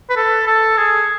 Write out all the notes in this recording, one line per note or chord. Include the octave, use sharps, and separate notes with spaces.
B4
A4
A4
G#4